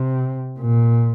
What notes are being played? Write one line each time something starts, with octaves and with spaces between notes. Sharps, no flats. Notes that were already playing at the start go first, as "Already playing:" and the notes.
Already playing: C3
A#2